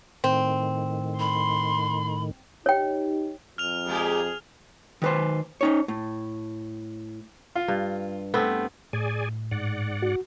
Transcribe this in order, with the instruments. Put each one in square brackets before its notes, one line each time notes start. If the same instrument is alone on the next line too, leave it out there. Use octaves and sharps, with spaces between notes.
[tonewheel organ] A2 D#3 [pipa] C4
[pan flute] B5 [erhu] C6
[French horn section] D#4 G4 [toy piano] C#5 G5
[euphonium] F2 [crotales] F6 F7
[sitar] A#2 G#3 G4 [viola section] G#4
[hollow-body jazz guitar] D#3 B4 C5
C#4 D#4 C#5
A2
[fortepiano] F4
[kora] G2
[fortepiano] A3 [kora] B3 C4
[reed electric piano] A2 [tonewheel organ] G#4 D5 G#5
[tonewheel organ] G#2 D5 F#5
[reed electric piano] F#4